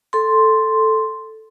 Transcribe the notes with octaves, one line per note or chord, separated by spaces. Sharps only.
A4 C6